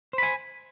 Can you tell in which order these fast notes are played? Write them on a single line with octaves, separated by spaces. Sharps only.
C5 B5 G#5